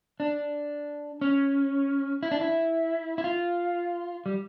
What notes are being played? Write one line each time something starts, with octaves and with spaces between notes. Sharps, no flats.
D4
C#4
E4
D4
E4
E4
F4
G3